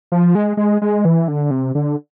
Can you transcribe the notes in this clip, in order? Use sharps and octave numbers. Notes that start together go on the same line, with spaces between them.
F3
G#3
G#3
G#3
E3
D3
C3
D3